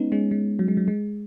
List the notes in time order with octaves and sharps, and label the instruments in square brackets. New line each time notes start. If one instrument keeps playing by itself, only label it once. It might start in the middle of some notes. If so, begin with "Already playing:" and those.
Already playing: [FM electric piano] G#3 B3 C#4 D#4
G#3 C#4
G#3
F#3
G#3
F#3
G#3